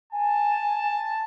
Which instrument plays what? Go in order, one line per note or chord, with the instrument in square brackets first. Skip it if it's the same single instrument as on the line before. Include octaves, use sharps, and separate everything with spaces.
[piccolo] G#5 [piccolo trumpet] A5